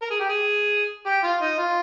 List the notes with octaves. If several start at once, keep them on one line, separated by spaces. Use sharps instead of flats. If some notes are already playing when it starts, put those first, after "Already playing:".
A#4
G#4
G4
G#4
G4
F4
D#4
F4